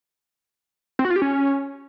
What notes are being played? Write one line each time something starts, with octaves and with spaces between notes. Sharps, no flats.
C4
F#4
F4
G4
C#4